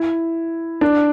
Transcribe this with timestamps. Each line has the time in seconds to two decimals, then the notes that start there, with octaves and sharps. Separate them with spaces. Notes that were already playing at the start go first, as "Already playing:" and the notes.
Already playing: E4
0.81 D4